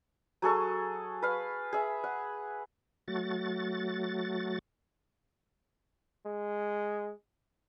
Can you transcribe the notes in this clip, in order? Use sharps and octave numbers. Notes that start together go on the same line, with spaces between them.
F#3 G#4 A4 C#6
B4 F5
G#4 E5
F#5
F#3 A3 F#4 A6
G#3